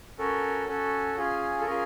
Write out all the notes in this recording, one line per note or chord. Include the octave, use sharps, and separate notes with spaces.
C#4 F#4 A4 A#4
C#4 F#4 A4
C#4 F4 G#4
A4
C#4 F4 G#4 A#4